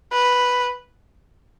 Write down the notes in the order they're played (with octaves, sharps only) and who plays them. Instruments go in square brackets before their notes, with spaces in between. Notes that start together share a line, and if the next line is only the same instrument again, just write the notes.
[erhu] B4